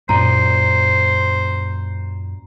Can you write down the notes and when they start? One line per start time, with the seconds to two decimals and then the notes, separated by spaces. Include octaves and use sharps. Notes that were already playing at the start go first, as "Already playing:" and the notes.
0.09 F#2 A#2 C5 A#5